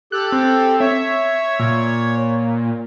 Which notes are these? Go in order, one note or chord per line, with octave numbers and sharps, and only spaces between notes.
G4 A4 F#6
C4
C#5 E5
A#2